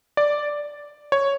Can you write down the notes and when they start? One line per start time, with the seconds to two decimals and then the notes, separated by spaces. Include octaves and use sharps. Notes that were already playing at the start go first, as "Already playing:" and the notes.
0.17 D5
1.12 C#5